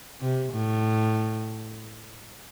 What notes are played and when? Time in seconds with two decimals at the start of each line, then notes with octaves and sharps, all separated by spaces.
0.21 C3
0.52 A2